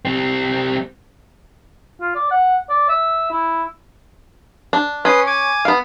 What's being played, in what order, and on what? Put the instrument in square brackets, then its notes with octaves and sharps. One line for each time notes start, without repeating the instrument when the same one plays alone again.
[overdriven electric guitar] G3 C4
[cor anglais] F4
D5
F#5
D5
E5
E4
[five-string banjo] D4
[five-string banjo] C#4 [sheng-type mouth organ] B4 C6 D#6
[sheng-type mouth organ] G#5 D6
[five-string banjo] B3 F5